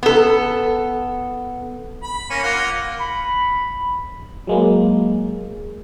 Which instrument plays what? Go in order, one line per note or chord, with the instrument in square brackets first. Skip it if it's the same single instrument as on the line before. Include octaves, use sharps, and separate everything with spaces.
[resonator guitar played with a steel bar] B3 A4
[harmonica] B5
A#3 C#4
A#3 F4 F#5
[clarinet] B5
[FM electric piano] F#3 G#3 A#3